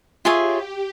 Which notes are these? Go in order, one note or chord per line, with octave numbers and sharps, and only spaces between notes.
F4 G4 G#4 C#5 E5